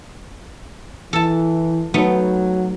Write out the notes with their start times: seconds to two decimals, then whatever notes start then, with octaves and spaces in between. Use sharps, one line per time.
1.13 E3 A4 A5
1.94 F#3 A3 B3 D#4